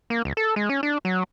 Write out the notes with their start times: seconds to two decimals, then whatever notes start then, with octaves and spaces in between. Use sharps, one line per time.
0.10 A#3
0.25 C#2
0.37 A4
0.56 G#3
0.69 C#4
0.83 D4
1.05 F#3